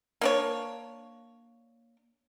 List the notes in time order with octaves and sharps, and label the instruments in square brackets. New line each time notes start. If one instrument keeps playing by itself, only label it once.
[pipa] A#3 D4 C#5